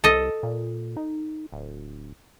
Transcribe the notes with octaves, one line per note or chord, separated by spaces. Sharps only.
C2 A4 D#5
A#2
D#4
D1